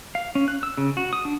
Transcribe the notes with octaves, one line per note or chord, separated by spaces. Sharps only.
F5
C#4
F#6
E6
C#3
F#4
D#6
D4